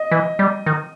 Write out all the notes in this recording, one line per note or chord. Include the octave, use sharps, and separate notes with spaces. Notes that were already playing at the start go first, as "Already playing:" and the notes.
Already playing: D#5
E3
G3
D#3